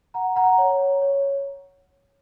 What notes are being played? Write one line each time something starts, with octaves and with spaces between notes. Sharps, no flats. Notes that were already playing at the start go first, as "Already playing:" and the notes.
F#5 A#5
F#5 A#5
C#5
C#5